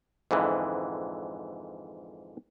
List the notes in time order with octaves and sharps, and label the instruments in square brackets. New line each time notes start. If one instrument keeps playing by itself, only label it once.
[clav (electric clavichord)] F2 G#2 D3 E3